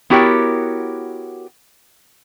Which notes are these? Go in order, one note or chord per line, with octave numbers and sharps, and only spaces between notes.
B3 E4 F#4 G4 A#4 C#5